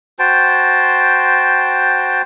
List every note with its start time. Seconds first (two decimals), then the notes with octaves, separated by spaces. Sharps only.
0.19 F#4 C5 G5 A5